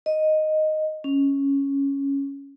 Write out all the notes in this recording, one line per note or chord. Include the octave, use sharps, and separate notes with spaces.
D#5
C#4